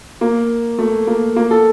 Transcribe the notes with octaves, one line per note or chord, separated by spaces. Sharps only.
A#3
A3
A#3
A#3
A4